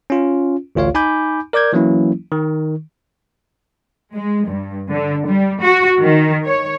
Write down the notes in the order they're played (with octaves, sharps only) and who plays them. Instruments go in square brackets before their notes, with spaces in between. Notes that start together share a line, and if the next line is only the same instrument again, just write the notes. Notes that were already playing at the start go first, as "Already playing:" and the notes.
[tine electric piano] C#4 F4
A1 D2 F4 C#5 F5
D#4 G#5 B5 D6 G6
A#4 D5 D6 G6 G#6
E3 F#3 A#3 C#4 E4
D#3
[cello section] G#3
G2
D3
G3
F#4
D#3
C#5